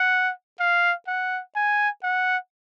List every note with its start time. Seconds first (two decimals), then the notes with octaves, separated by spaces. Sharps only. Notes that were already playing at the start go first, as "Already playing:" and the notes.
Already playing: F#5
0.60 F5
1.08 F#5
1.56 G#5
2.03 F#5